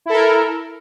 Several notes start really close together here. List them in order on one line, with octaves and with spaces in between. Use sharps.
E4 A4 A#4